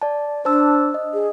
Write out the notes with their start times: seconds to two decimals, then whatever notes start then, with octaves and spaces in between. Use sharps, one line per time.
0.02 D5 A5
0.45 D4 C5 A5 E6
0.94 D#5
1.14 G#4